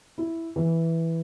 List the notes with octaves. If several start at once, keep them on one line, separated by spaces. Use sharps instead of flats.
E4
E3